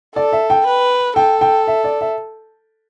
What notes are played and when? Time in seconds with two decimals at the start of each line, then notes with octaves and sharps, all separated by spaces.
0.16 A4 D5
0.32 E5
0.50 G5
0.66 B4
1.16 A4 G5
1.41 G5
1.67 E5
1.84 D5
2.01 E5